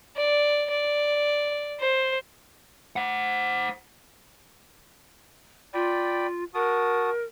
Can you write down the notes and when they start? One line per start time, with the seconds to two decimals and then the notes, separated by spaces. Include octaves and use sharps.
0.17 D5
0.70 D5
1.81 C5
2.96 C5 F#5
5.74 F4 D5 G5 B5
6.54 F#4 A#4 A5 D#6